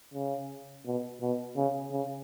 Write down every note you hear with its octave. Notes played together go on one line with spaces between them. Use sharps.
C#3
B2
B2
C#3
C#3